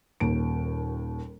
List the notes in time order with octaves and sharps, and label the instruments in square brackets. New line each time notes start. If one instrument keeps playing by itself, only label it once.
[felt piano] D#1 D#2 D7